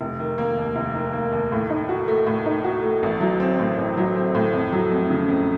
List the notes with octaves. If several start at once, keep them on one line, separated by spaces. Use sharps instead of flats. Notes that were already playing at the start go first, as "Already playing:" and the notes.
F1
D#3
A#3
D#2
F1
D#3
A#3
D#2
A2
D#4
F#4
A3
A2
D#4
F#4
A3
A1
F#3
C4
A2
A1
F#3
C4
A2
F2
F#3
F2
C#3
F2